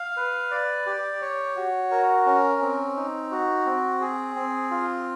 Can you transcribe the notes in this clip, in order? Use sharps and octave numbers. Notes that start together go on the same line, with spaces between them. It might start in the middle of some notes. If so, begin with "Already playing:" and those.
Already playing: F5
B4
D5
G4
C#5
F#4
A#4
C#4
C4
D#4
F#4
C4
G#4
C4
F4